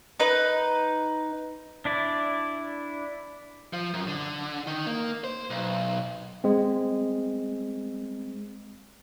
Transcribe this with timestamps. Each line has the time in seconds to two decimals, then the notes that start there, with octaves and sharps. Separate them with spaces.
0.20 D#4 B4
1.85 D4 E4 D5
3.73 F3
3.93 F#2
4.07 D3
4.67 D#3
4.87 A#3
5.24 C5
5.50 B1
6.44 G#3 C4